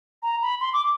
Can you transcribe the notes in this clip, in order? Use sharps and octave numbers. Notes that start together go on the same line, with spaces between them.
A#5
B5
C6
D6